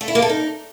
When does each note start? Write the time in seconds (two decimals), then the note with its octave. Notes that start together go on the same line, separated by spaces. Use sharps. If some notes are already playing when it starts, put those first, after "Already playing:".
0.01 A3
0.08 E4
0.15 A#3
0.22 A4
0.29 D#4